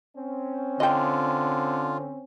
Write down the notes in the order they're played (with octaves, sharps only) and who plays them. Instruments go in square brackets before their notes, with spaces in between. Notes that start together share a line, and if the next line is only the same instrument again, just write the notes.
[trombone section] C4 C#4
[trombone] D3 [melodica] F4 [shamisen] D#5 G5